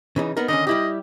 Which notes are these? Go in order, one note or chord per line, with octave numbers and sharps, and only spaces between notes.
C#3 E3 D#4
B3 D#4 A#4
D3 D#3 C#4 D#5
G3 E4 G4 D#5